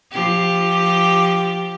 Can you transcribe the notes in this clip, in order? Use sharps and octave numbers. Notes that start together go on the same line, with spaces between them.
F3 G4